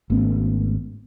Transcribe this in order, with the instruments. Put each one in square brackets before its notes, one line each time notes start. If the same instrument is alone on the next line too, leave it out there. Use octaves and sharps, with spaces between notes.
[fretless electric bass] G#1 A3 B3 C#4